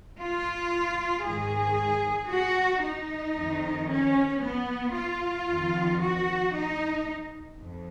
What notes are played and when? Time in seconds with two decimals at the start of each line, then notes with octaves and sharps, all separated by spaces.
0.18 F4
1.24 G#2 D#3 G#4
2.30 F#4
2.82 D#4
3.35 F2 D#3
3.88 C#4
4.41 B3
4.94 F4
5.47 F2 D#3
6.00 F#4
6.53 D#4
7.59 F2